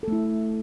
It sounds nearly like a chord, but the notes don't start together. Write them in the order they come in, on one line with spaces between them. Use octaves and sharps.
A4 A3 E4